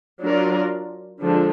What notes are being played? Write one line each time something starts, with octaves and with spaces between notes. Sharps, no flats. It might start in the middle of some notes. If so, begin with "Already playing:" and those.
F#3 D4 F4 A#4 D5
D3 F3 G#3 D4